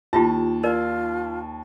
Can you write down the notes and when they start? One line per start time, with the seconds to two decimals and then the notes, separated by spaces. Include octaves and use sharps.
0.13 D#2 E4 F4 G4 A5
0.63 D#4 F4 A#4 D5